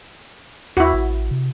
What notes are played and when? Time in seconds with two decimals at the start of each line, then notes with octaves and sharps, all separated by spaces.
0.77 D#2 E4 F#4
0.94 A1
1.31 C3